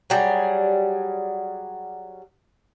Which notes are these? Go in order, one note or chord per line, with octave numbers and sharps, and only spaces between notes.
F#3 G3 G#4